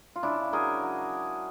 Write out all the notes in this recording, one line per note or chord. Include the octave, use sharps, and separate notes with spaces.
F4
C#3 D4 E4
F#3 G#4 A#4
F#3